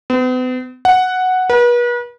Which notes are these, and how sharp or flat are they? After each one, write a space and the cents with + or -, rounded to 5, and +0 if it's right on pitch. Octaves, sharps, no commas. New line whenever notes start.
B3 +45
F#5 +0
B4 -40